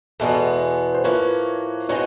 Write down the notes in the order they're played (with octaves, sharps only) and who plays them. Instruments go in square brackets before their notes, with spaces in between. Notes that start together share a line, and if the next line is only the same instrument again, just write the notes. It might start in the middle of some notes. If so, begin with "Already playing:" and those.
[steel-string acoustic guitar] E2 B2 G#3 B3 [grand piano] A4 B4
[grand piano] C5
[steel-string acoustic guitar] A2 F3 A#3 [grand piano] B4 C#5
[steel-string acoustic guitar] B2 G#3 C4 D#4 [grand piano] B4 C#5